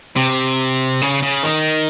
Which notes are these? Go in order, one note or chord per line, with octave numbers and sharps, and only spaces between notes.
C3
C#3
C#3
D#3